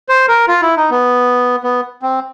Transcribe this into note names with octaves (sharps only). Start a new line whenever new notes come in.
C5
A#4
F4
E4
D#4
B3
B3
C4